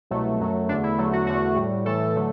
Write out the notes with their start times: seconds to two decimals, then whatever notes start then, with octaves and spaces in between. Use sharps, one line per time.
0.11 C2 B2 F#3 A3
0.40 F#2 F#3 A3
0.69 E2 D3 A3 D4
0.84 E4
0.98 E2 D3 F#3 A3
1.13 F#4
1.27 E2 D3 A3 F#4
1.56 A2 G3
1.85 A2 E3 A3 A4
2.16 D3 F#3 A3